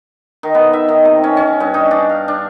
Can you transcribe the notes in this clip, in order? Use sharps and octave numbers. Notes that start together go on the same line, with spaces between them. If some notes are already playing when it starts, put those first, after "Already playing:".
D#3
B3
E5
D#3
C3
C#4
C#4
G2
D#4
D4
F5
D4